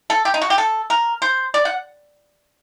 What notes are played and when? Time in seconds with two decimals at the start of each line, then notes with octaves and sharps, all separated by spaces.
0.10 A4
0.25 G4
0.34 D#4
0.42 F#4
0.50 G4
0.58 A4
0.90 A#4
1.22 C5
1.54 D5
1.65 F#5